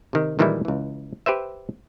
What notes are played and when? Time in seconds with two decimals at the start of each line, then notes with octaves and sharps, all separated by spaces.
0.13 C3 D#3
0.39 A#2 D#3 E3 G3 G#3 E4
0.65 C#2 E3
1.26 G4 B4 C5 E5